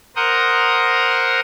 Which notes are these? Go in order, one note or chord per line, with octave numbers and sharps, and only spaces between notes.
A#4 C5 F#5 A#5 C6 D#6